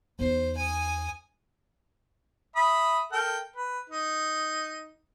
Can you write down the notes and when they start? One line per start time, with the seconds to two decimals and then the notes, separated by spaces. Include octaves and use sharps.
0.19 E2 D#4 C5
0.57 G#5 D#6
2.56 E5 B5 D#6
3.12 A4 A#4 G5
3.56 B4
3.90 D#4